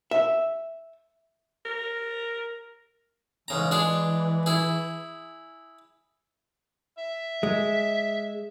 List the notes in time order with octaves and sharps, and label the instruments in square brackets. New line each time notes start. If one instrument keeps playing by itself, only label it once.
[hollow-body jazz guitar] E5
[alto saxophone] A#4
[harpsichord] G#2 C#3 A#5 [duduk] E3
[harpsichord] G#3 D4 G#4
E4 G#4
[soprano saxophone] E5
[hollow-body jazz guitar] G#3